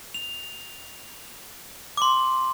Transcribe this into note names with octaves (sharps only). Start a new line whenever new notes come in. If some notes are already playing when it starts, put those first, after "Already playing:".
F7
C6 D6